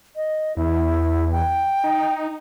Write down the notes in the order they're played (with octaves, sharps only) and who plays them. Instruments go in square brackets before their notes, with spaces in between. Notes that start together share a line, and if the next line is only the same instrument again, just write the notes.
[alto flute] D#5
[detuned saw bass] E2 [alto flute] E4
[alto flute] G5
[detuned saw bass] D#4